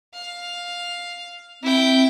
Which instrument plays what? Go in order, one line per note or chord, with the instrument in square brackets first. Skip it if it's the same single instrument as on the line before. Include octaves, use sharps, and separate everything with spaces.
[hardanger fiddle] F5
[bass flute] C4 [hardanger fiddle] E4 G5